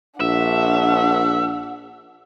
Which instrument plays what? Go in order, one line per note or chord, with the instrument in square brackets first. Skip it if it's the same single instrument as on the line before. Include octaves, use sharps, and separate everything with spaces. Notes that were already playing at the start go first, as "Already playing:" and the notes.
[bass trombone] A#1 [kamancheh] D4 F#5 [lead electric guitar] E5